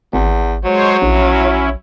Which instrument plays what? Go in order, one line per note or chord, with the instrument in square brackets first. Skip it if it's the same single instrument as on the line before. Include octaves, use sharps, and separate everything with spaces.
[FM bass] G#1 [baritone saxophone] E2
[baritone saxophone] F#3 [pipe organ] G#3 C5 C#5
[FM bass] A#1 [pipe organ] C#4 E4